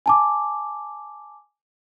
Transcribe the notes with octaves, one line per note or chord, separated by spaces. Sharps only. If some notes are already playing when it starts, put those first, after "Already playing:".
G#5 A5 D6